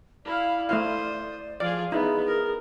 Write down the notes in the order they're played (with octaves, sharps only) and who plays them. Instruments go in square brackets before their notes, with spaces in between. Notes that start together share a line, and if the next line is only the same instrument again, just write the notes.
[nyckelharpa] E4 F5 [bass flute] D5
[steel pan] A3 E4 F5 [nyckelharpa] C5 D#6
[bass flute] F3 [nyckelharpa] F4 G#4 [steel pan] D5
[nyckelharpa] B3 [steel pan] D#4 E4 [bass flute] G#4
[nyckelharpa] A#4